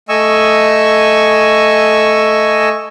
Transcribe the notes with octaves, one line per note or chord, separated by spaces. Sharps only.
A3 D#5 G#5 C#6 E6